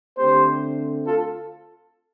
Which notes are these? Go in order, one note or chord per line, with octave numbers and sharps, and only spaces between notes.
D3 A3 C4 G4 C5
F4 A4